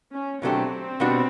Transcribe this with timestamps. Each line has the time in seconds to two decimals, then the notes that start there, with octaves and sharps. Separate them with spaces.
0.12 C#4
0.42 B2 F#3 A3 C4 D4 G4
1.00 B2 G3 B3 D4 F#4